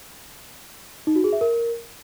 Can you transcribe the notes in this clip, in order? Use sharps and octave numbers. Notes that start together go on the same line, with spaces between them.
D#4
F#4
G#4
E5
A#4